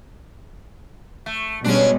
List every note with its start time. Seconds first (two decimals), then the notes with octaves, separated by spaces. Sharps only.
1.26 A3
1.64 B2 G3 G#3 C#4 D4